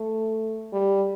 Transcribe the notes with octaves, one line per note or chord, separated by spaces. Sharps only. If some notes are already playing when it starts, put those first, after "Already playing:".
Already playing: A3
G3